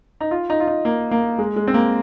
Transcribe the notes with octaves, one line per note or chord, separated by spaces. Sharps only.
D#4
F4
D#4
F4
D#4
A#3
A#3
G#3
G#3
C4
A#3